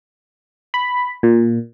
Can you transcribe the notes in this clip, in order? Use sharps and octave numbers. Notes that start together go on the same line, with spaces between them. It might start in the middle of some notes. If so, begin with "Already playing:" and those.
B5
A#2